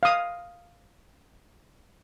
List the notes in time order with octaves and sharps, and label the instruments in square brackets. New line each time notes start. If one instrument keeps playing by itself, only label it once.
[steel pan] F5 D#6